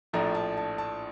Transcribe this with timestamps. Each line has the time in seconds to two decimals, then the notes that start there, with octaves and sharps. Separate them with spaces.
0.13 A#1 A2 F3 A3 D4 A#5
0.35 A5
0.57 A5
0.78 A5